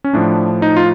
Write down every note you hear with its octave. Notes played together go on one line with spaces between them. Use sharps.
C#4
A2 F3 D4
D#4
F4